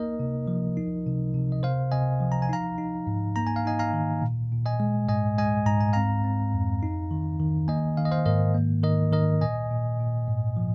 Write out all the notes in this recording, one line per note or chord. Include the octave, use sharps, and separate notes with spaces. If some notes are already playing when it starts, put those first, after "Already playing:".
Already playing: A#3 D#4 A#4 D#5
C3
F3
D#4
C3
C3
D#5
C3 C5 F5
C3 D#5 G#5
F3
A#5
G#5
D#4 F5 A#5
D#4
G#2
A#3 A#5
G#5
F5
D#4 D#5 G#5
F5 A#5
D#3
A#2
A#2
D#5 G#5
G#3
G#2 D#5 G#5
G#3 D#5 G#5
G#2 A#5
G#5
C4 F5 A#5
C4
F2
D#4
D#3
D#3
A#3 D#5 G#5
D#3 F5
D#5
C5 F5
G#2 A#4 D#5
A#3
D#3 A#4 D#5
D#3 A#4 D#5
A#2 D#5 G#5
A#2
A#2
G#2
F3